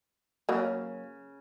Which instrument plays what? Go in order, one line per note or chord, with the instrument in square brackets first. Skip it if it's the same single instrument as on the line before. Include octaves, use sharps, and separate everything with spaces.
[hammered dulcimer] C#3 [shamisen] F#3 A#3